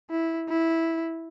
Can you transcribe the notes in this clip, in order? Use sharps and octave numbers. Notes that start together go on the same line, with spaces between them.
E4
E4